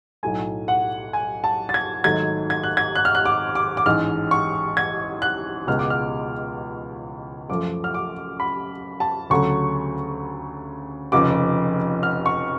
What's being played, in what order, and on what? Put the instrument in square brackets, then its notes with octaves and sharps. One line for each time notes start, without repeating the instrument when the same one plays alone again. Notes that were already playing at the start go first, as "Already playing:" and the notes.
[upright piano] B1 A2 F#3 A3 G#5
F#5
G#5
A5
A6
G#6
G#1 G#2 F#3 A3 G#6
G#6
F#6
G#6
F#6
F6
F#6
D6
D6
D6
A1 G#2 G#3 F6
C#6
G#6
F#6
C#2 B2 G#3 F6
D6
F6
F#2 F3 A3 D6
F6
D6
B5
A5
D2 C#3 F#3 A3 C#6
F1 F2 C#3 F3 D6
F6
C#6